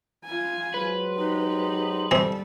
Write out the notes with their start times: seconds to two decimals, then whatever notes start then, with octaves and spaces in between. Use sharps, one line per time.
0.24 F4 G#5
0.74 F#3 G#3 B4 C5
1.17 D#4 G4
2.11 D3 E3 G3 C4 D#4 A4